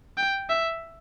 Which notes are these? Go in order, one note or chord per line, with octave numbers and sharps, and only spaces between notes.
G5
E5